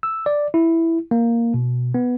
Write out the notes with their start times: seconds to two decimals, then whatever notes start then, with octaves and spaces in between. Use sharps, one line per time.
0.03 E6
0.26 D5
0.54 E4
1.11 A#3
1.54 B2
1.94 B3